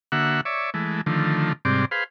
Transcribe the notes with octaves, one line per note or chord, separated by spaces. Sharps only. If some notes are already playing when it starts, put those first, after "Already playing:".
D3 A#3 F#4 E5 F#5
C#5 D5 E5
E3 G#3 A3
D3 D#3 F3 A3
G#2 C3 G3 C4 D5
G#4 B4 C5 F5